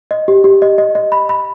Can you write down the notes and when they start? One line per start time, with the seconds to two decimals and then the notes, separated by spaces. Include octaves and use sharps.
0.11 D#5
0.28 G4
0.44 G4
0.62 D#5
0.78 D#5
0.95 D#5
1.12 B5
1.29 B5